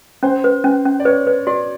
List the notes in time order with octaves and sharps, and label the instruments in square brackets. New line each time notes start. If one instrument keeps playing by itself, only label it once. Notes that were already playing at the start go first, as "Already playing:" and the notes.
[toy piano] C#4 [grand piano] C5
[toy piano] B4
C#4
C#4
[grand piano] D5
[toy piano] B4 [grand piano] C#5
[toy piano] B4
[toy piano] F#4 [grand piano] D5